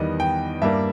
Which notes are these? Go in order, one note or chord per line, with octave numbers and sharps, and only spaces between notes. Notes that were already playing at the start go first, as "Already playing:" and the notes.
Already playing: E2 D#3 G3 B3 D#5
G5
G2 G3 A#3 E5